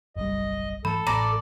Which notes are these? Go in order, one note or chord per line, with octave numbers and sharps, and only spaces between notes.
F#1 B1 G3 D#5
G#2 E3 A3 A4 B5
A1 A2 D5 A#5 B5 A#6